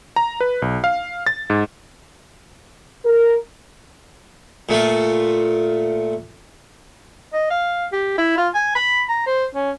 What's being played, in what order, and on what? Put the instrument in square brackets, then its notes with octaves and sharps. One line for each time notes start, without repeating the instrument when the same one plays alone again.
[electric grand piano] A#5
B4
B1
F5
A6
G#2
[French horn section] A#4
[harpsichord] A#2 A3 F4
[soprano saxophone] D#5
F5
G4
E4
F4
G#5
B5
A#5
C5
C#4